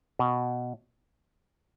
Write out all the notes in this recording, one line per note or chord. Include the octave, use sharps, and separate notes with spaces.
B2